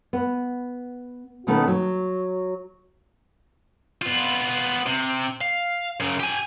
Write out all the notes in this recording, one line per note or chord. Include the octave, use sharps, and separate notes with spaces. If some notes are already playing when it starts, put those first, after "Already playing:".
B3
B2 D#3 A3 B3 C#4
F#3
B3 F4
C3
F5
F#2 C#3
G4 G#5